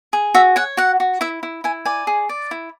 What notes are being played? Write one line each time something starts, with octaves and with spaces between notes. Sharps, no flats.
G#4
F#4 E5
C#5 F#5
F#4 F#5
F#4
E4 E5
E4
E4 G#5
D5 G#5
G#4
D5
E4